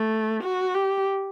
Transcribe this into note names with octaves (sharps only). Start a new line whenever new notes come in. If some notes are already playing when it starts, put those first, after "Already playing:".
Already playing: A3
F#4
G4